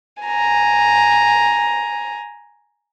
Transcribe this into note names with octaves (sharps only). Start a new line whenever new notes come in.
G#5 A#5